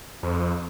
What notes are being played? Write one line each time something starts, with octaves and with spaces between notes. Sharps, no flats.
F2